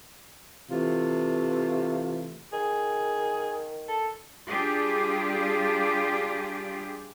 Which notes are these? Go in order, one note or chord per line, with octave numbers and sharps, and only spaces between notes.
C3 E3 A3 F4
D#3 G#4
A4
G3 D4 F4 G4 G#4